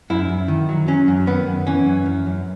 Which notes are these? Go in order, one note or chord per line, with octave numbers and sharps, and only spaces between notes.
F#2 E4
F#2
D#3
F#3
F#3 C#4
F#2
D#3 B3
F#2
E3 C#4
F#2
F#2
F#2